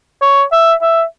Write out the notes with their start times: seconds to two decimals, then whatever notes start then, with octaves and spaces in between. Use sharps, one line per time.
0.21 C#5
0.52 E5
0.82 E5